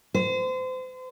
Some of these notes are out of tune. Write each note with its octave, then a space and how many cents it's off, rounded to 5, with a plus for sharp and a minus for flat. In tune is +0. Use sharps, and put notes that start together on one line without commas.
C5 -35